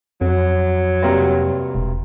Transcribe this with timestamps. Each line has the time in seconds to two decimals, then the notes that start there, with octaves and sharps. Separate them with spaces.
0.21 F2 F#3
1.03 G2 C3 A#3
1.75 E1